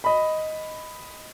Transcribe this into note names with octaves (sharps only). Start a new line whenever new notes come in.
D#5 B5